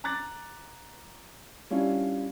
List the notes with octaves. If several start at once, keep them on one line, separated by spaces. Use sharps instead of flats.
A#5 D6 F#6 A6
G3 C#4 D4 E4 F4